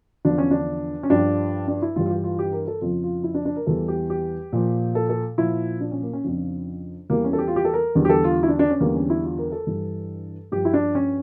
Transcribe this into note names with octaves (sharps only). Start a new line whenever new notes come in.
E2 D3 F3 D4
C#4
D4
C#4
G2 F3 D4
D4
E4
G2 E3 G3 F4
F4
G4
F4
G4
A#4
A4
F2 C#3 F3 F4
F4
E4
D4
D4
A#4
E2 E3 G3 A4
G4
G4
A#2 F3
A4
A4
A#2 F3 E4
D4
C#4
A#3
C#4
F2 C#3 F3 D4
E2 E3 G3 A#3
C#4
A4
G4
F4
G4
A4
A#4
E2 D3 G3
G4
A4
F4
E4
D4
D4
C#4
E2 D3 G3 A#3
C#4
E4
F4
A#4
A4
G2 E3 G3
G2 F3 G4
E4
D4
C#4